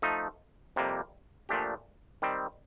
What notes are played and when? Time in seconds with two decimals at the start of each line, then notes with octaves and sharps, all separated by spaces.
0.02 F3 A3 D#4
0.76 F2 C3 G3 A#3
1.49 A#2 F3 A3 D4 G4
2.22 D#3 G3 C4